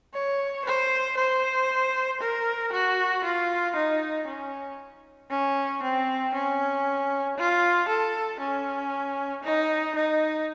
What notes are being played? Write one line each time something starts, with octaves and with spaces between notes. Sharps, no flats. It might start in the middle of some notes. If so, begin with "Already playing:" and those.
C#5
C5
C5
A#4
F#4
F4
D#4
C#4
C#4
C4
C#4
F4
A4
C#4
D#4
D#4